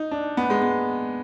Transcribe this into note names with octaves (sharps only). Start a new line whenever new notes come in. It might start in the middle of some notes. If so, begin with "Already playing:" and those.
Already playing: D#4
D4
B3
G#3
B3